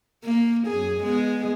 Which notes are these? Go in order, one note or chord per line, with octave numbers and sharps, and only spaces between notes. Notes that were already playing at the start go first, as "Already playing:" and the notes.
A#3
F#2 G#4
G#3 B3 G#4